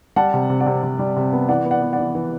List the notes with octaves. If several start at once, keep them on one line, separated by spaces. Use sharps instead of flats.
G3 F#5 A5
C3
C3
D5 F#5
C3
C3
G3
C3
B3
E3 D5 F#5
B3
D5 F#5
B3
D5 F#5
E3
E3